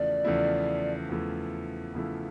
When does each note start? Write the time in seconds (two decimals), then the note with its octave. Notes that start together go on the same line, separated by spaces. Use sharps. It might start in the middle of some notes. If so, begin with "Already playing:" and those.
Already playing: E2 C#3 F3 A3 E4 D5
0.25 E2 C#3 F3 A3 E4
1.09 E2 C#3 F3 A3 E4
1.93 E2 C#3 F3 A3 E4